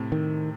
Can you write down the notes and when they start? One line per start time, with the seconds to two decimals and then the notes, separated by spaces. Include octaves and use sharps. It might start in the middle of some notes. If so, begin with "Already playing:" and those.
Already playing: A2 C3
0.12 D#3